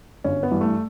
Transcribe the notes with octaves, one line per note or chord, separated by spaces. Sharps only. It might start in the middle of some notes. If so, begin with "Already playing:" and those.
G1 C#4
B3
G2 E3
A3